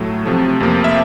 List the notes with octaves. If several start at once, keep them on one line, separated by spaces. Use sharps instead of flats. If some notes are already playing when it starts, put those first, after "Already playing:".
Already playing: A2 F#3 A3
C3 F3 A3
F2 C3 F3 A#3
E5